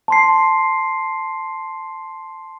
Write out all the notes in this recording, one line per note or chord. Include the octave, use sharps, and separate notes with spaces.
A5 C6 C7